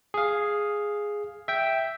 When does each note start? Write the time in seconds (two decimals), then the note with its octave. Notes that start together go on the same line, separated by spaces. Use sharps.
0.14 G#4 F5
1.48 E5 G5